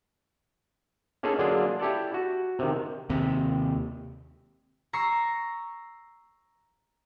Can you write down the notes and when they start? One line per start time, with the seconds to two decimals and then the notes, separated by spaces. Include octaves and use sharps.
1.23 A#3 C#4 D#4 F4 G#4 A4
1.39 D3 F#3 A#3 D4 F4 G#4
1.80 E4 G4 A4 D5
2.14 F#4
2.59 C3 D#3
3.10 D#2 C3
4.93 A#5 C#6 E6 A#6 C7